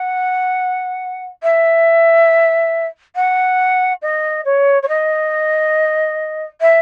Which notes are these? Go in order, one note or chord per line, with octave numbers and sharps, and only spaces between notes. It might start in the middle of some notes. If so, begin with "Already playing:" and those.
Already playing: F#5
E5
F#5
D#5
C#5
C#5
D#5
E5